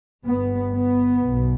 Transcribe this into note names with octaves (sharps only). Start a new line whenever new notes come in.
G1 G2 B3
B3
B1 B2